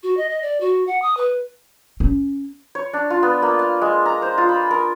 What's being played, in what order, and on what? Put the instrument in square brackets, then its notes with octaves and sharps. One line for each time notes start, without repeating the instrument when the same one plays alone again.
[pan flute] F#4
D#5
D#5
D5
F#4
F#5
D#6
B4
[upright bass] C#4
[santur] C#5
D4
F4
B3
A#3
F5
G#3
A#5
C5
F4
B5
A#4